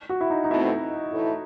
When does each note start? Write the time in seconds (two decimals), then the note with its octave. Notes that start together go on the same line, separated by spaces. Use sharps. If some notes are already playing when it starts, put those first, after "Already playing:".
0.09 F#4
0.21 E4
0.30 D#4
0.44 D#4
0.50 B2 A3 C4 E4
1.11 A2 E3 A3 E4